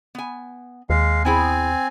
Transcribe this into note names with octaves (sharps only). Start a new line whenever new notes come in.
B3 G#5
D#2 G#3 F5
B3 C4 E4 G#4 G#5